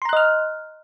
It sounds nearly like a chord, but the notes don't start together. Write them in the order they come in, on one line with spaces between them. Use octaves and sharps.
C6 A#5 F#6 D#5 F6